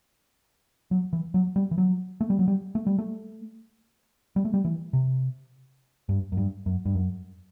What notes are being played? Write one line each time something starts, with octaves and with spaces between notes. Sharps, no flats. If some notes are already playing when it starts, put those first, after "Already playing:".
F#3
E3
F#3
G3
E3
F#3
A3
G3
F#3
G3
A3
G3
A3
G3
A3
G3
E3
C3
G2
F#2
G2
F#2
G2
F#2